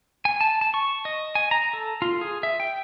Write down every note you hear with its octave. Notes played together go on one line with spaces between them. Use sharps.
G#5
A5
A5
C#6
D#5
G#5
A#5
A4
F4
G#4
E5
G5